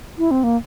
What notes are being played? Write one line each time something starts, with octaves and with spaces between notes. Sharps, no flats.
E4
C4
A#3